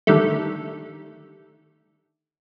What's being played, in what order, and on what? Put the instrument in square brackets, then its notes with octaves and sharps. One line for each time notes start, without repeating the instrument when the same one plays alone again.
[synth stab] D3 D#3 G3 A3